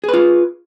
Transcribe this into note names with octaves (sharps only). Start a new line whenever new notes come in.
F4 G#4 B4